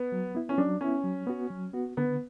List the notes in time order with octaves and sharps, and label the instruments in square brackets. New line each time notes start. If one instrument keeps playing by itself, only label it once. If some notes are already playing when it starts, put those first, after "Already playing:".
Already playing: [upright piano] B3
[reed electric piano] F#3
B3 E4
[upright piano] C#4
[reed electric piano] F#3 [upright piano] D4
[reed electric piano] B3 E4 [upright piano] C#4
[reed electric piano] F#3
B3 F#4
F#3
B3 F#4
[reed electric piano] D3 [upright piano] B3